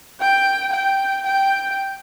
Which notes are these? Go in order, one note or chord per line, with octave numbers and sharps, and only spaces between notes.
G5
G5
G5